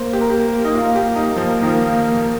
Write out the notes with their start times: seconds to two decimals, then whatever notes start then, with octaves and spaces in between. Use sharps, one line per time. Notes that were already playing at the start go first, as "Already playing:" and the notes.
Already playing: A#3 C5
0.13 G4
0.21 A#4
0.30 G4
0.65 D#4
0.75 F4
0.95 G4
1.16 D#4
1.36 F3 A#3
1.62 D#3
1.66 F3